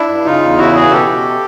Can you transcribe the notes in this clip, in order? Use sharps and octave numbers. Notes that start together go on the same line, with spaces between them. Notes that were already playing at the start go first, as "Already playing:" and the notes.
Already playing: D4 E4
G2
C#3 D#4 F4
E2
C#3 E4 F#4
E3 F#4 G#4
B2 G4 A4
B2